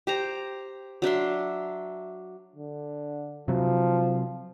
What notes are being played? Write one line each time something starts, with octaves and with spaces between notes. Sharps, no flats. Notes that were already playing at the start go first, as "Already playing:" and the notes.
G4 C5 A#5
F#3 D4 E5 C6
D3
C3 F3 F#3